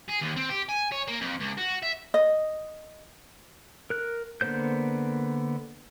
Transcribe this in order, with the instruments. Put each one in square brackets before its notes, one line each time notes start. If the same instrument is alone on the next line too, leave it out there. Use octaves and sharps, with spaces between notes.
[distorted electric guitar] G#4
D#2
C4
G4
G#5
C#5
A#3
F2
C#2
F#4
E5
[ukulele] D#5
[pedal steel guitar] A#4 F#6
D3 A#3 B3 C5 G6